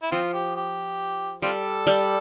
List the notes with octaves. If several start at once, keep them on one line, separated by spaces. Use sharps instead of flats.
E4
F3 C4 F4
G4
G4
G3 C4 F4 A4
G3